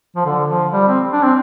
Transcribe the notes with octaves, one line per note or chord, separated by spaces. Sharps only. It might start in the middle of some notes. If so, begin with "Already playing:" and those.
F3
D3
F3
G3
C4
D4
C4